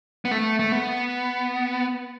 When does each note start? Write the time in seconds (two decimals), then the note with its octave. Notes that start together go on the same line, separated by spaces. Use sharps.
0.25 B3
0.31 A3
0.59 A3
0.72 B3